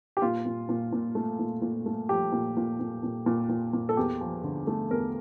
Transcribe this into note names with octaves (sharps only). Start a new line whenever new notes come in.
G4
A#2 F4
A#2
A#2
A#2
A3
A#2
A#2
A3
F3 G4
A#2
A#2
A#2
A#2
A#2
A#2
A#2
A4
E2 G4
F3
D3
A3
E2 A#4